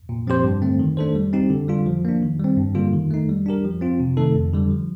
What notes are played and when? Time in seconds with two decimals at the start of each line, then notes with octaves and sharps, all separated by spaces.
0.09 A#2
0.27 F3 C4 G4 C5
0.44 G2
0.62 D3 A3 C4
0.79 D#3
0.97 A3 D4 A4 C5
1.15 G3
1.33 C4 D#4 G4
1.50 D3
1.68 G3 D4 F4
1.86 F3
2.05 A#3 D4
2.22 D#3
2.40 G3 C4
2.57 G2
2.75 D3 G3 A#3 F4
2.93 D#3
3.10 A3 D#4
3.29 G3
3.46 D4 G4 A#4
3.64 F3
3.81 C4 F4
4.00 C3
4.17 D#3 A3 D#4 A4
4.34 F2
4.53 D3 G3
4.70 F3